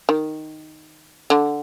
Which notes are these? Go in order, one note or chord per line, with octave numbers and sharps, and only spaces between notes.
D#3
D3